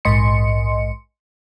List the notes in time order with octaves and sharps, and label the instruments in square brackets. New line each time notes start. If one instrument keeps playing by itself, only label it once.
[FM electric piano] A#1 G#2 D#5 C6 C#7